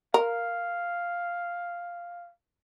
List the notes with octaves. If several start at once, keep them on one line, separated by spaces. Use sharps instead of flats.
A#4 F5